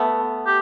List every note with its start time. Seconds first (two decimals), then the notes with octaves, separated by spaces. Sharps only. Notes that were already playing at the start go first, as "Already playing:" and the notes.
Already playing: A3 B3
0.47 G4